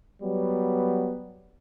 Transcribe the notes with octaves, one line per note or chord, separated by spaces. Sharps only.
F#3 G3 B3